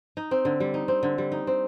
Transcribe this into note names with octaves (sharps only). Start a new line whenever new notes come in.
D#4
C4
D3
G3
D#4
C4
D3
G3
D#4
C4